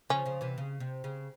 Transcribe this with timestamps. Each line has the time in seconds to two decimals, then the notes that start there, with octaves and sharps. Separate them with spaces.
0.09 C#3 F3 C#4
0.26 C#3 F3
0.41 C3 E3
0.58 C#3
0.80 C3
1.04 C#3